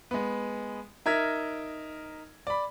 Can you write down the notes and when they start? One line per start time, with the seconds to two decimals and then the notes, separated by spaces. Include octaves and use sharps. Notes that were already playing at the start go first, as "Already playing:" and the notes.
0.11 G#3 B3
1.06 D#4 A#4 E5 G#6
2.47 D5 B5